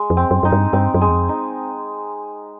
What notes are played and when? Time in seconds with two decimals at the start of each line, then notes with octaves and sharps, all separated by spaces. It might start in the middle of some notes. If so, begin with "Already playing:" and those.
Already playing: G#3
0.10 F2
0.17 C4
0.31 F#2
0.43 F#2 D#4
0.52 G2
0.73 G2 C4
0.94 F#2
1.01 G#3
1.08 E2
1.15 F2
1.29 D#4